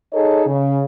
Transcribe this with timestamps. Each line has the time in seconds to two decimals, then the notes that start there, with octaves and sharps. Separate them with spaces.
0.13 D#4 G#4 A4 C#5 D#5
0.47 C#3